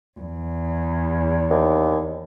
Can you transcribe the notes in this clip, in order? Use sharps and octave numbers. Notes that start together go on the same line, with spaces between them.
E2
D#2